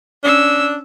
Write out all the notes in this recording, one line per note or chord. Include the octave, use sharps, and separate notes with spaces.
C#4 D4 E6